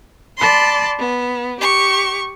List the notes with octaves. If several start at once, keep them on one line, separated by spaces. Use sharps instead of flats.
D5 A5 B5 C6
B3
G4 C#6